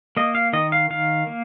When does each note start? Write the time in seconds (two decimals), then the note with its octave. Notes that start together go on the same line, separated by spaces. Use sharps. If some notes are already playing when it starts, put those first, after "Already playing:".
0.17 A#3 D#5
0.35 F5
0.53 D#3 D#5
0.72 F5
0.90 D#3 F5
1.27 A#3